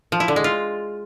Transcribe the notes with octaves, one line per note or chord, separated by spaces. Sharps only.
F3
E4
D3
G#3
F4